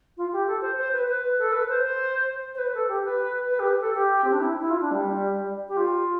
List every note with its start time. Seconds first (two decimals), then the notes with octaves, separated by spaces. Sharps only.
0.17 F4
0.32 G4
0.46 A4
0.61 C5
0.78 C5
0.92 B4
1.08 B4
1.38 A4
1.52 B4
1.68 C5
1.83 C5
2.54 C5
2.58 B4
2.74 A4
2.88 G4
3.04 B4
3.50 B4
3.59 G4
3.80 A4
3.94 G4
4.24 C4
4.32 D4
4.40 E4
4.60 E4
4.70 F4
4.81 D4
4.91 G3
5.68 G4
5.76 F4